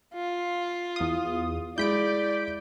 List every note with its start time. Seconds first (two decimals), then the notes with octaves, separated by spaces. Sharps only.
0.14 F4
0.96 E2 D#6
1.78 G#3 E4 D5 G6 B6 D7